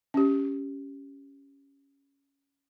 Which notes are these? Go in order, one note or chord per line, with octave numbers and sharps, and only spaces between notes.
C#4 G4